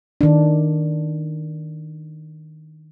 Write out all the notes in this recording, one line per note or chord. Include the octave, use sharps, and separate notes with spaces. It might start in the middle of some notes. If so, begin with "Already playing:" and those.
D#3 D4